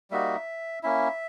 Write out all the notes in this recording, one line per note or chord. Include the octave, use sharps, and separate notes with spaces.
G3 A#3 D#4 F#4 E5
A#3 C#4 E4 E5